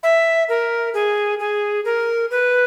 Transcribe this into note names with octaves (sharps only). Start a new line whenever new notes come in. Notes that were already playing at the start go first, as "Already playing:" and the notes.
E5
A#4
G#4
G#4
A#4
B4